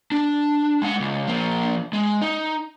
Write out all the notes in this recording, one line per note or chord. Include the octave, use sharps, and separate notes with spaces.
D4
G#3 F#5
C#2
F3 A#3
G#3
D#4